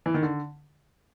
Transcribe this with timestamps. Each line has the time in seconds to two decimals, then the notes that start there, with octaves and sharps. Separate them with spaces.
0.06 E3
0.14 D#3
0.23 D3